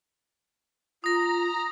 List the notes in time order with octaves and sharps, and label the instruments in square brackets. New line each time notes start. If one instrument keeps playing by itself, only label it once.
[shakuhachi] F4 [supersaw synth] A#5 [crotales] D#6 A#6